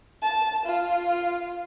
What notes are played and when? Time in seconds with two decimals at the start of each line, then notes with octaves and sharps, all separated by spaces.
0.23 A5
0.65 F4